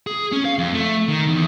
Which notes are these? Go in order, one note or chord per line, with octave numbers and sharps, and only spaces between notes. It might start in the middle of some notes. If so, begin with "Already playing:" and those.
G#4
C#4
F5
F2
A3
D#3
E2